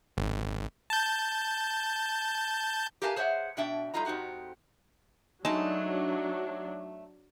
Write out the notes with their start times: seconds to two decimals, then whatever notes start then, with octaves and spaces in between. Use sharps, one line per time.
0.17 G#1
0.90 A5 G6
3.02 G4 A#4 B4 F5 G#5 A5
3.16 G#4 C5 C#5 E5 F#5
3.57 B2 D4 E5 G5
3.94 G3 A3 D#4 F4 D#5 A#5
4.05 F2 C4 D#4 F#4 G4
5.45 F#3 G#3 A3 D4 D#4 A5